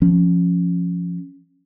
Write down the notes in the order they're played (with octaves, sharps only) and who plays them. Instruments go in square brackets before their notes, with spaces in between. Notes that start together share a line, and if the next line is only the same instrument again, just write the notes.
[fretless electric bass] F3 C#4